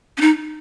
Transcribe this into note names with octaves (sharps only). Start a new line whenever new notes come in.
C#4
D#4